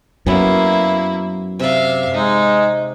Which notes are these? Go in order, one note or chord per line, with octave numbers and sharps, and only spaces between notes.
F#2 F#3 A#3 B3 E4
C3 D5 E5 F5
G#3 D#4